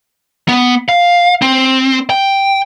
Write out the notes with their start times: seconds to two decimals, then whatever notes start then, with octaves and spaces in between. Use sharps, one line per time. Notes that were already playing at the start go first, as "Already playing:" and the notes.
0.48 B3
0.89 F5
1.42 C4
2.10 G5